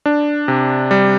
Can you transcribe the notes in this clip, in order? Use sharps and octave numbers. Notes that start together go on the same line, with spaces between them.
D4
C3
G3